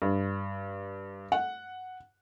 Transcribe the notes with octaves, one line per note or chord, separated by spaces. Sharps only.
G2
F#5